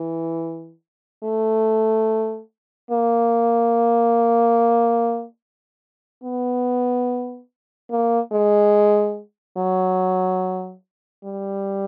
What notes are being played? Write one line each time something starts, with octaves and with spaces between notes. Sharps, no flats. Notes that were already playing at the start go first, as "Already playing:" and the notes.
Already playing: E3
A3
A#3
B3
A#3
G#3
F#3
G3